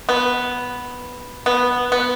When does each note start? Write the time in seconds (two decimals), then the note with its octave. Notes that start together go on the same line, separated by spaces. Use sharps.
0.09 B3
1.46 B3
1.92 B3